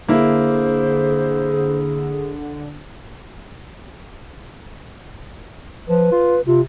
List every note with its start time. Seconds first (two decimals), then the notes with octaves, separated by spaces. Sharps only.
0.08 D3 A#3 E4 G#4 C5
5.88 F3 B4
6.12 F4
6.47 C3 F4